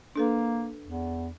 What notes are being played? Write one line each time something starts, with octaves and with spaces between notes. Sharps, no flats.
A#3 D4 A4 B4
E2